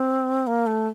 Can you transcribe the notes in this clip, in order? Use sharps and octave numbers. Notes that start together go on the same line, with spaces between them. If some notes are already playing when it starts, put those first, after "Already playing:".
Already playing: C4
A#3
A3